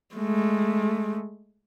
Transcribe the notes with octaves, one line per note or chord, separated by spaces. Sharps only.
G#3 A3